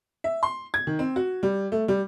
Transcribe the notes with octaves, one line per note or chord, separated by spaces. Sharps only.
E5
C6
G#6
D#3
C4
F#4
G3
A3
G3